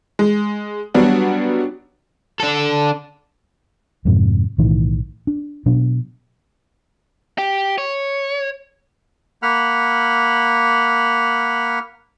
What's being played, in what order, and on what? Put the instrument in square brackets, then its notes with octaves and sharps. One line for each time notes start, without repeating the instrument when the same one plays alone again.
[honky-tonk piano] G#3
F#3 G3 B3 D4 F#4
[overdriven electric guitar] D4 A4
[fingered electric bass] F2 G#2 C3 F3
B1 A2 D#3 E3
D4
B2 F#3 D4
[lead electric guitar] G4
C#5
[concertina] A#3 F#5 B5 F6